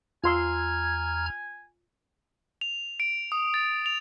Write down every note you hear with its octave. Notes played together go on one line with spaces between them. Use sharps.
E2 F4 G#5 A#5 C6 E6 F6 G#6
F7
D7
D#6
A6
F7